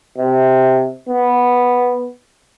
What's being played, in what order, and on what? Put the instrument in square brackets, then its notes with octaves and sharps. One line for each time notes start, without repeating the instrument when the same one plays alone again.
[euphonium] C3
B3